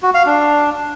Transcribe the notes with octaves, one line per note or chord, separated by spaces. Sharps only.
F#4
F5
D4